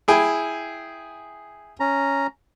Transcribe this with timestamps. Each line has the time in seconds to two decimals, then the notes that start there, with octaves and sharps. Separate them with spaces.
0.08 E4 G#4 G5
1.80 C#4 A#5